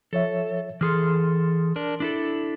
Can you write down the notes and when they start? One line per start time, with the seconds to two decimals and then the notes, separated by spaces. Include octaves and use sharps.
0.13 F3 A4 C#5 E5
0.81 E3 G#4 A4 C6 F6
1.76 D4 A#4
2.00 D4 E4 A4